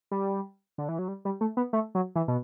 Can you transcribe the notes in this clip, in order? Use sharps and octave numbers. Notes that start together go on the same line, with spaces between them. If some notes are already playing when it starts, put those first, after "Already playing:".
G3
D3
E3
F#3
G3
G3
A3
B3
A3
F#3
E3
B2